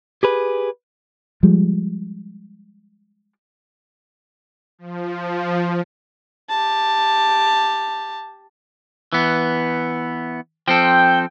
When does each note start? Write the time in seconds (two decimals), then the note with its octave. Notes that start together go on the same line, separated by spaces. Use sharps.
0.23 G4 G#4 B4
1.43 F3 G3 G#3
4.79 F3
6.50 G4 A5
9.13 E3 B3
10.68 F3 C4 A4 G5